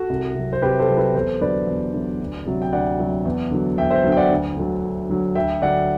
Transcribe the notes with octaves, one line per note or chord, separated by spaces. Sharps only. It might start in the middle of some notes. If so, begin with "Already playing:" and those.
Already playing: F#4 A4
C2
C3 F#3
C5
C2 G4 B4
A4 C5
C3 F#3
G4 B4
E2 A4 C5
D3 F#3 B4 D5
E2
D3 F#3
D2
C3 F#3
G5
D2 D5 F#5
C3 F#3
E2
D3 F#3
E2 E5 G5
C5 E5
D3 F#3
G5
D5 F#5
D2
D3 F#3
D2
D3 F#3
D2 E5 G5
D3 F#3 D5 F#5